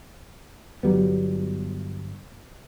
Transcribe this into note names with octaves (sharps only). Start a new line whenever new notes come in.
G1 F#3 G3 B3